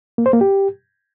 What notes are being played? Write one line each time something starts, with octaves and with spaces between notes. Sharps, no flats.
A#3
C5
A#3
G4